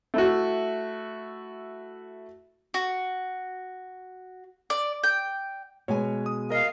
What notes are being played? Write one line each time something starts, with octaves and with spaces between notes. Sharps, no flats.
A3 E4 F#4
F#4
D5
G5
B2 G#3 C#5 G#5
D#6
A#4 D#5 F5